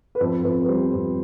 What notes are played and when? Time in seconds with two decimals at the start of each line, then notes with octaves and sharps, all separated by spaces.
0.15 B4
0.20 F2 C5
0.44 F2 B4
0.62 B4
0.68 G3 C5
0.93 F2